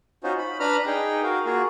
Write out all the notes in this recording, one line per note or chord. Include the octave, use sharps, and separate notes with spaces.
C#4 D#4 F4 F#4 C5
B5
D4 B4 A#5 B5 F6
D#4 G#4 G5
F#4 A#4 F5
A#3 F4 F#4 G#4